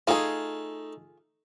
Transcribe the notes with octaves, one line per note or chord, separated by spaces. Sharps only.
A3 D#4 F4 G#4